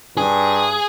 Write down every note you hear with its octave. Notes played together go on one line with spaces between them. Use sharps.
G2 G#4